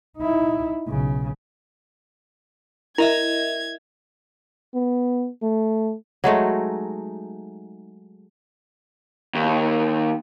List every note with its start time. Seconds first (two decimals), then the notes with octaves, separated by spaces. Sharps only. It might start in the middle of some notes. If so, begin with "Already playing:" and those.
0.17 D#4 E4
0.87 B1 C#3
2.98 E4 A#4 D#5 E5 G#6
4.74 B3
5.42 A3
6.24 F#3 G#3 A3 D#4
9.35 D#2